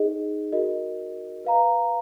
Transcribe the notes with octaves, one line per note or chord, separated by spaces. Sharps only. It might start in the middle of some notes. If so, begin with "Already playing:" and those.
Already playing: D#4 G#4 D#5
F#4 A#4 D#5
B4 F5 A#5